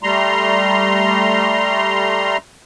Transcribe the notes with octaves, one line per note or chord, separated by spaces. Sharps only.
G3 A3 A#5 C6